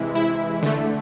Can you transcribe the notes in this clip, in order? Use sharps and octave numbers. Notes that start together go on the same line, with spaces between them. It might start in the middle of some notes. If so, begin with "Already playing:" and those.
Already playing: C3 E3 G#3 E4
E4
D3 A3